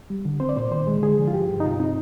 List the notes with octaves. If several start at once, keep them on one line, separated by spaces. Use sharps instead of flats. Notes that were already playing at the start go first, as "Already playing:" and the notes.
G3
D3
C4 C5
D5
A#2 C5
D#3 C5
G#3
D3 G#4
F3
F4
G2 G4
G2
D#4
C3 F4
C4 D#4